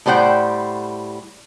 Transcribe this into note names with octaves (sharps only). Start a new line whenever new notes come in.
A2 G3 C5 F#5 G5